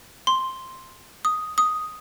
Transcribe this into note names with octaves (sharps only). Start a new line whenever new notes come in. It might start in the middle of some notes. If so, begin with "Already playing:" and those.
C6
D#6
D#6